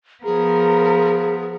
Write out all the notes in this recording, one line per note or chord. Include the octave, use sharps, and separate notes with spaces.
F3 B3 G#4 A#4